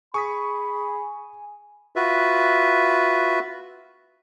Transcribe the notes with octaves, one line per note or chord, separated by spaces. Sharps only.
G#4 G#5 B5 C#6 D#6 B6
F4 F#4 B4 E5